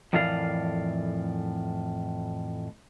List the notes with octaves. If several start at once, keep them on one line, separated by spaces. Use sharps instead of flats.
F2 A2 E3 A#4 D5 F5